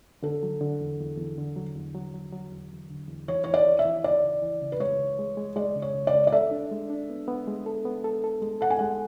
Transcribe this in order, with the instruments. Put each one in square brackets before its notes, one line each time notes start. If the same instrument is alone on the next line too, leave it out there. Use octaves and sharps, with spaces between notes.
[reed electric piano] D3 [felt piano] A4
[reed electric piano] F#3
D3
E2
E2
E2
D3
F#3
E2
F#3
F#3
F#3
E2
E2
D3
E2
[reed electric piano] E3 [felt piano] C#5
[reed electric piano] E3 [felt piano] C#5
[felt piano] D5
[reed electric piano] E3
[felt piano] E5
[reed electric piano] E3
[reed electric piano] C#2 [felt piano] D5
[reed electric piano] C#2
E3
C#3
[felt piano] B4
[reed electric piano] G#3 [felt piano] C#5
[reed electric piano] C#2
G#3
G#3
[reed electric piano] G#3 [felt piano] D5
[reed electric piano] C#3
[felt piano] C#5
[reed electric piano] C#2
[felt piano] D5
[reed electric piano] C#2
[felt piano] D5
[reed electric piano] A4 [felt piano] E5
[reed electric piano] D4
G#3
D4
B3
B3
G#3
A4
B3
A4
A4
G#3
[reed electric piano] A4 [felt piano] F#5
[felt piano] G#5
[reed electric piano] G#3 [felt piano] F#5